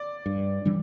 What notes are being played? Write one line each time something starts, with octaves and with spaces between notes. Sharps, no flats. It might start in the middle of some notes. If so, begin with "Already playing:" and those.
Already playing: D5
G2
E3 G3 D4